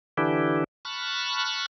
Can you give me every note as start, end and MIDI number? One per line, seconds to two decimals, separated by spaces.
0.18 0.64 50
0.18 0.64 52
0.18 0.64 62
0.18 0.64 64
0.18 0.64 67
0.85 1.66 81
0.85 1.66 83
0.85 1.66 85
0.85 1.66 89
0.85 1.66 90